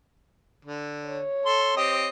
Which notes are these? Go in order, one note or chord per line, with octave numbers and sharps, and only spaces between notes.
D3
C#5
A4 C6
C4 G4 D#5